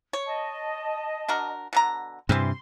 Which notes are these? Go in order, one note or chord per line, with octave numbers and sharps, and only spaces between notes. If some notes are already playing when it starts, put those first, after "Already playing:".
C#5
D#5 A5
D4 F#4 A#4
B2 D3 A#5
G2 C3 E3 C4 C6